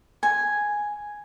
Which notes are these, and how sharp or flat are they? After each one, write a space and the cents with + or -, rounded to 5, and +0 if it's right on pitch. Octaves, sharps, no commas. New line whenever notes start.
G#5 +0